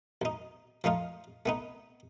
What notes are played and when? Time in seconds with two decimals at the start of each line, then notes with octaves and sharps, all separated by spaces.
0.22 B1 D#4
0.84 F3 A3 D#4 F4
1.46 A3 B3 D#4